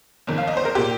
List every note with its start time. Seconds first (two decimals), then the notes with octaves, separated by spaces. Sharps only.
0.27 G1 F2 D#3 A#3
0.38 F5
0.47 D#5
0.57 C5
0.65 A#4
0.75 A#2 A#3 G4